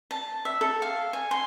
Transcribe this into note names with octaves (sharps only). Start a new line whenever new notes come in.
A5
E5
A4
F5
G#5
C6